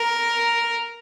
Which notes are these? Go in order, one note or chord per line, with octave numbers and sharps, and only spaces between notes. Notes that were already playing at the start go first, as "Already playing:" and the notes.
Already playing: A#4